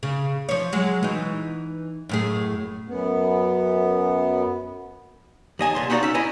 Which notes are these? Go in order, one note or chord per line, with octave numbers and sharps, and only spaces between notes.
C#3
F3 C#5
F#3 G#3
E3 D#4
F#2 A2 G#4
F#2 B3
D#2 D#5 G#5 A5
C2 A#2 C6
D#4 E4 F#4 D5 F5 A#5
C#4 E5
E4 D#5 G#5 A#5